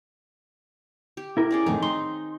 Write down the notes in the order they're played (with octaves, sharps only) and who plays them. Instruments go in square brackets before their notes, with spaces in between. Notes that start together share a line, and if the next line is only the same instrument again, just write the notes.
[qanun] G4
[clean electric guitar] E4 A#4
[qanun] C#4 G#4 D5
[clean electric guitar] F2 A2 [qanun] D#3 C4
[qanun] D#4 [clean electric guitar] C6